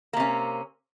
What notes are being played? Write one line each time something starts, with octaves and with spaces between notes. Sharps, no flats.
C3 A#3 C#4